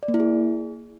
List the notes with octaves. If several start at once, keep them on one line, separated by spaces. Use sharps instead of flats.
D5
A#3
E4
G#4